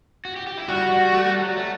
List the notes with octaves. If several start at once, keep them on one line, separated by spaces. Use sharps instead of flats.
F#4
G4
G4
E4
G3 F#4
G3
A3
G3
F#3
A3